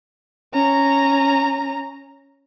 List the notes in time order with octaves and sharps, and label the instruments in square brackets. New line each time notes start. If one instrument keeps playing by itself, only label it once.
[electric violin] C#4 A#5